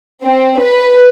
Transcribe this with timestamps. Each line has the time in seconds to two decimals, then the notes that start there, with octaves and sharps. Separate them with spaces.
0.24 C4
0.62 B4